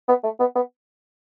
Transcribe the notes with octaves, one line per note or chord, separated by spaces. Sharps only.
B3
A3
B3
B3